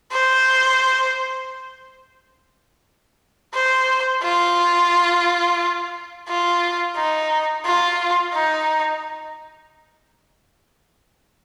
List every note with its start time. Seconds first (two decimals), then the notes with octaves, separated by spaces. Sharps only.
0.12 C5
3.54 C5
4.23 F4
6.28 F4
6.96 D#4
7.65 F4
8.34 D#4